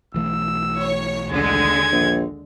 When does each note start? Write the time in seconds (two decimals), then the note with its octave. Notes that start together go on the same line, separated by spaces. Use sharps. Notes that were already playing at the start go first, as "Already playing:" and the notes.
0.14 B1 E3 A3 E6
0.78 C#5
1.32 D#2 D3 G#3 G#6
1.92 A#1